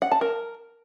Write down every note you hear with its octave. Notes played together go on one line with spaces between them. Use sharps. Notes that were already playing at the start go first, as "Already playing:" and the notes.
F#5
A5
A#4